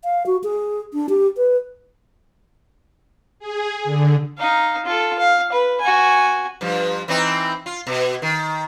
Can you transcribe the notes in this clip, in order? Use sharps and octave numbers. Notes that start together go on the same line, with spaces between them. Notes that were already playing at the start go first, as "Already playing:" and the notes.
F5
F#4
G#4
D4
G4
B4
G#4
D3
D#4 F5
F4 A4
F5
B4
F#4 G#5
G2 F3
E3 C4 D#4
F4
B2
D#3